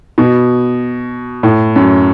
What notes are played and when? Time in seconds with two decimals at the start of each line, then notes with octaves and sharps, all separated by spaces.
0.18 B2
1.43 A2
1.76 F#2